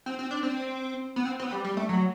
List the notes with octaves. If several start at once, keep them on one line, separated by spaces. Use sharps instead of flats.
C4
C4
D4
C4
B3
C4
C4
B3
G3
G3
A3
F#3